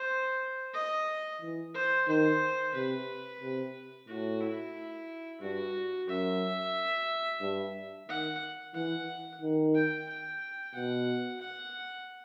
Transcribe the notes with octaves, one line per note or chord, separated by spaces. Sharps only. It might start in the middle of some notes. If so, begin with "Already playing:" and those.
Already playing: C5
D#5
E3
C5
D#3 C5
C3 B4
C3
A2 F#4
E4
G2 F#4
F#2 E5
G2
D#3 F#5
E3 F#5
D#3
G5
G5
B2 F#5
F#5